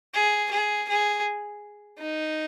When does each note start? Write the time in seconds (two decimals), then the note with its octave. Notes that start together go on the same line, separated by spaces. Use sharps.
0.14 G#4
0.51 G#4
0.89 G#4
1.99 D#4